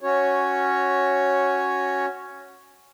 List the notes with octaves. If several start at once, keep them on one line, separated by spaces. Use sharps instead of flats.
C#4 F#4 C#5